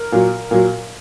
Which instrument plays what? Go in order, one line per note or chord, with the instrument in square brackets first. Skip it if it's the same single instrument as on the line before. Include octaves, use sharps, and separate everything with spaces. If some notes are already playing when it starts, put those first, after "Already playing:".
Already playing: [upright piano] A#4
A#2 F#3
A#2 F#3